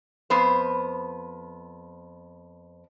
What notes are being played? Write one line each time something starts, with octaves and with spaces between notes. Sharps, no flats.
F2 B3 C5